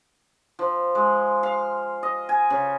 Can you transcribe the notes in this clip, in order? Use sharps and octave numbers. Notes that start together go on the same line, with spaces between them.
F3
G#3
F5
D#5
G#5
C#3